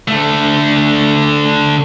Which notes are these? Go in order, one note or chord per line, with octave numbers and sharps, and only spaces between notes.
D3 A3